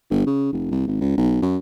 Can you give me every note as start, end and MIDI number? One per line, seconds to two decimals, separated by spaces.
0.10 0.24 31
0.26 0.52 49
0.53 0.67 29
0.71 0.85 36
0.87 0.97 32
1.01 1.13 37
1.17 1.37 35
1.42 1.57 42